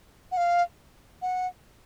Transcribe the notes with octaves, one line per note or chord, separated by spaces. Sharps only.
F#5
F5
F#5